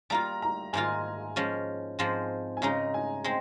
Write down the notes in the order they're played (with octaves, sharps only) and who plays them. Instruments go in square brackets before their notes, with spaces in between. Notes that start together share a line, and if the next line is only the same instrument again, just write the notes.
[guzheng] G3 A#3 F4 [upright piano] A#5
[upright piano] A#5
[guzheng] G#2 D#3 A#3 F4 [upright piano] G#5
[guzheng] F3 G#3 C#4
G#2 F3 G#3 C4
[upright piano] G#5
[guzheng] C#3 G#3 D#4 [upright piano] A#5
[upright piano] G#5
[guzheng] G#3 C4 [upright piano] G5